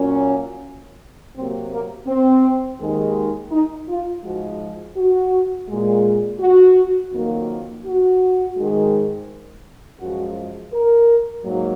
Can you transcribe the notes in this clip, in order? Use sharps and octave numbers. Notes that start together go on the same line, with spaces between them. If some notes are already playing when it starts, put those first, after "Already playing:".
Already playing: A#2 F#3 A#3 C#4
C3 F#3 A#3 C4
A#3
C4
D#2 D#3 G#3
D#4
F4
G#2 F3 G#3 F#4
F#4
A#2 G#3
F#4
F2 D#3 F#3 A#3
F#4
G#2 D#3 G#3
F#2 F3 G#3 F#4
A#4
G#2 F#3 A#3